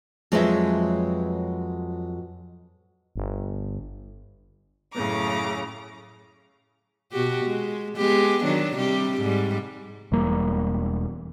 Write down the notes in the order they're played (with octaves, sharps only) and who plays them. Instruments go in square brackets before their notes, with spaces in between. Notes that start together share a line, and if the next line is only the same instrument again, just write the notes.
[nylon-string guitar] F2 F#3 G#3 B4 C#5 E5
[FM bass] G1
[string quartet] F#2 A2 C#3 A#5 D6
[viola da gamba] B2 F#4 G4
G#3
G#3 B3 G4
D#3 F#3 D4
C3 G3 G4
G#2 G3
[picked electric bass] E1 E2 G3 A#3